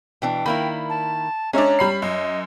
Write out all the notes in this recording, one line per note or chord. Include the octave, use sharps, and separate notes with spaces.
B2 E3 D4 G5
D#3 A#3 E4 B5
A5
G#3 C#4 D4 C#5 E5 A#5
G3 B5 C7
F#2 D#5